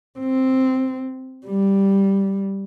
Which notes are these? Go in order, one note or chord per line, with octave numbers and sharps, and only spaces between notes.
C4
G3